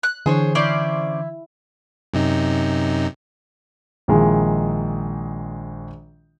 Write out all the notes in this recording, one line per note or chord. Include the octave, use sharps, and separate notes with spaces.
F#6
D3 E3 G#4 C5 C#5
C#4 E4 C5 D5
F#2 C3 D#4
A#1 D#3 G#3 E4